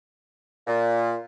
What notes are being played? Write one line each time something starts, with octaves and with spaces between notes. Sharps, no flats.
A#2